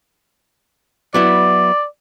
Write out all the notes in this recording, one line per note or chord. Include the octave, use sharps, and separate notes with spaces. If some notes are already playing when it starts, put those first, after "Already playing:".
F#3 B3 E4 D5